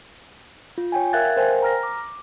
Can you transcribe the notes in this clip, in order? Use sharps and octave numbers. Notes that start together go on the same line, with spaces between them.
F4
C#5 G5 G#5
A#4 E5 F5 F#6 G#6 A6
A#4 C5 F5 G5 G#5
A#5 F6 A#6
D6